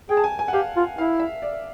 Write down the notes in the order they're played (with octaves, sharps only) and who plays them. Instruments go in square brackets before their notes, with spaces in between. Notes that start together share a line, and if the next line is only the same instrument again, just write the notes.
[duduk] G#4 [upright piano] G5
[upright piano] A5
G#5
G#5
F#5
[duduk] G4 [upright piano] F5
[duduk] F4
[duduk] E4 [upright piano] F5
[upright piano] E5
D5